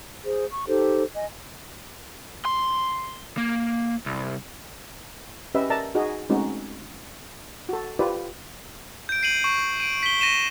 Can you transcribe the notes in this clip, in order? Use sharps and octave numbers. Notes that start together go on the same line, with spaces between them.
G#4 C5
C#6
D#4 G4 A4 C5
D#5 G#5
C6
A#3
C2
C#4 G4 B4 D#5 E5
A#4 D5 E5 A5 A#5
D#4 F#4 G#4 D#5
G#3 A3 C4 C#4 D#4 F#4
F#4 A4
F4 G4 B4 C5 D5
G6 D7
C7 D#7 F#7
C#6
D7 D#7
B6 D7 G7
A#6 D#7 E7